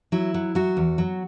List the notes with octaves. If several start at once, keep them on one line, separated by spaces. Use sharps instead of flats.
F#3 E4
F#3
F#3 F#4
E2
F#3